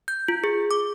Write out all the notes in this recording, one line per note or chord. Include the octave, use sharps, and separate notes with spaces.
G6
F4
G#4
D6